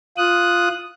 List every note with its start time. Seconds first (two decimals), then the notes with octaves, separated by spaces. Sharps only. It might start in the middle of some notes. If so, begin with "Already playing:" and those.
0.17 F4 D#6 F#6